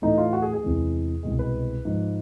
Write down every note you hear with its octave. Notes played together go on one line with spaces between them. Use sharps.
A2 E3 A3 D#4
F4
F#4
G#4
G#4
E2 C3 E3 G#3
C2 B2 G#3
B4
G#2 F3 G#3